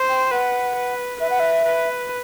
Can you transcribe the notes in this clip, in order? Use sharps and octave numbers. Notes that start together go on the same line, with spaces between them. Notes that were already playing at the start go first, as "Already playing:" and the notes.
Already playing: C5
G5
B4 F#5
B4
B4 E5
F#5
E5
B4